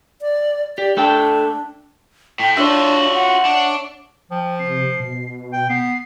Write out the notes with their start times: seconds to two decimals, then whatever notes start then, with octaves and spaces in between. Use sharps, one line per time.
0.21 D5
0.78 G4 D5
0.97 A3 D4 A4 G5
2.39 A2 G5
2.57 D4 F4 F#4 C#5 E5
3.14 F#5
3.45 D4
4.31 F3 G5
4.59 C3 C7
5.00 B2
5.53 G5
5.70 B3 C7